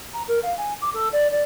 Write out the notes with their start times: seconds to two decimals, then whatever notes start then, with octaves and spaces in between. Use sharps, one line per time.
0.13 A#5
0.28 A#4
0.43 F5
0.57 G#5
0.81 D6
0.93 A4
1.12 D5
1.31 D5